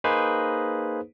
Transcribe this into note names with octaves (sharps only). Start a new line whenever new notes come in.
A#3 D#4 G#4 B4 C5